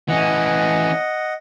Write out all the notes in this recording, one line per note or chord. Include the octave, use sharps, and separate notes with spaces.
E3 C#4 D#5 F#5